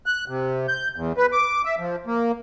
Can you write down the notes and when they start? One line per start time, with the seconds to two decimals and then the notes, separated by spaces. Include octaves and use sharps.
0.06 F#6
0.28 C3
0.68 G6
0.96 E2
1.17 B4
1.32 D6
1.65 E5
1.78 F3
2.07 A#3